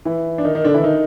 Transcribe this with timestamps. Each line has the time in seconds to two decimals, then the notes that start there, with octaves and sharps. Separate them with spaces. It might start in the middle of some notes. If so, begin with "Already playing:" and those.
0.05 E3 E4
0.38 D4
0.45 D#3 D#4
0.55 D#3 D#4
0.64 D3 D4
0.74 E3 E4
0.83 D#3 D#4